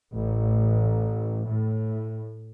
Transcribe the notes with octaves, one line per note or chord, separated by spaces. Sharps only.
A1
A2